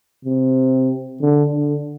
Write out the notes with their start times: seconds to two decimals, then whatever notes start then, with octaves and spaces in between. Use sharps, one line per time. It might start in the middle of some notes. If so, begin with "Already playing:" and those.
0.25 C3
1.21 D3
1.52 D3